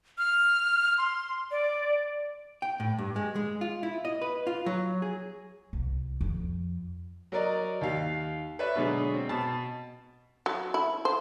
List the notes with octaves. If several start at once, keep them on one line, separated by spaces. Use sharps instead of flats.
F6
C6
D5
G5
A2
G2
G#3
G#3
F4
E4
D#5
B4
F4
F#3
G#4
C2
F2
F#3 A#4 D5 D#5
D#2 F5
B4 C#5 D5 E5
B2 D3 F#3 G#3
C4
B2 A5
F#3
E4
C5